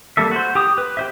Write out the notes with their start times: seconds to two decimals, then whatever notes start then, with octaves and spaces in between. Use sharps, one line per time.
0.17 G3 A#3 A4 E5
0.31 F#4 C5
0.55 G4 D6 D#6
0.78 B4
0.97 G4 C5 E5